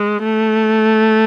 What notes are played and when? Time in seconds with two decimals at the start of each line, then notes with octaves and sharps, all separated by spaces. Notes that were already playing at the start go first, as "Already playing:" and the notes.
Already playing: G#3
0.23 A3